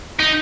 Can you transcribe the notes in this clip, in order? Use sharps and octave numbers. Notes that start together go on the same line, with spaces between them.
D#4